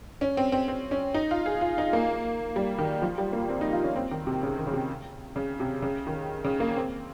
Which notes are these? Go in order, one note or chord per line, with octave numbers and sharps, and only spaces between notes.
C#4
C4
C4
C4
C#4
D#4
F4
G#4
F4
D#4
A#3
G3
D#3
F3
G3
A#3
C4
D#4
F4
C#4
C4
D#3
C3
C#3
D#3
C#3
C3
C#3
C3
C#3
D#3
C#3
A#3
C4